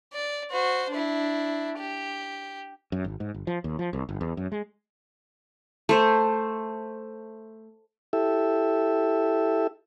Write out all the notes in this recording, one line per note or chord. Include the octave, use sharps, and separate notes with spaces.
D5
F#4 C5
D4 E4
G4
F#2
G#1
G#2
G1
F3
D#2
F3
C2
G1
E2
F#2
G#3
A3 C5
E4 G4 A4 E5